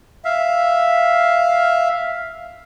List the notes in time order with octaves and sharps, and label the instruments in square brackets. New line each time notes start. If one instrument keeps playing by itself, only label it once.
[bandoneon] E5 F5